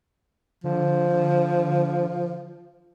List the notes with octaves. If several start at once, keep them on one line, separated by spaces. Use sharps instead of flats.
D3 F3